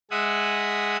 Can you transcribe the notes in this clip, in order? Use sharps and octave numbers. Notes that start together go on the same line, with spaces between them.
G#3 E5 F#5 G#5 D#6